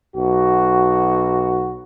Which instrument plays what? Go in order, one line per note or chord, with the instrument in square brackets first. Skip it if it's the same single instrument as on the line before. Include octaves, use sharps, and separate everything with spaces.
[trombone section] B1 F#4